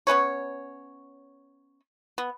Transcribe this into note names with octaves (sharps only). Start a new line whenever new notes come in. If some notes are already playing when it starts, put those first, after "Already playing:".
B3 C#4 B4 C#5
B3